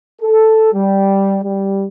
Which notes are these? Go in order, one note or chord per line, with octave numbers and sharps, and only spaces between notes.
A4
G3
G3